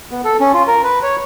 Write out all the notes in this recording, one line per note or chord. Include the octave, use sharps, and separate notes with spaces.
B3
A4
C#4
F4
A#4
B4
C#5